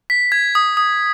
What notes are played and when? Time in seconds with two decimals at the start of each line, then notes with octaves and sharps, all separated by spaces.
0.10 B6
0.32 G#6
0.55 D#6
0.77 D#6